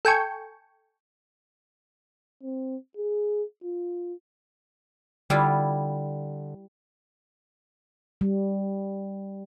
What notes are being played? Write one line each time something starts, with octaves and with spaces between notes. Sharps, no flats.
A4 G5 G#5 C#6
C4
G#4
F4
D3 G3 E4 F4
G3